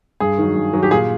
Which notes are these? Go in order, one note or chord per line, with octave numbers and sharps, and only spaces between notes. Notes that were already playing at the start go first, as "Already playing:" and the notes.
G2 G#4
D#3 F#3
G2
D#3 F#3
G4
A#2 G#4